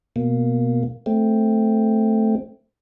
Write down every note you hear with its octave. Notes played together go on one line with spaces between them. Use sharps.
B2 A#3
A3 C4